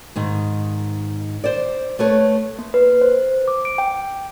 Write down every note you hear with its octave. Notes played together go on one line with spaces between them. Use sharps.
G#2 D#3
C5 D5
A3 B4 C#5
A#3
B4
C5
D6
D7
G5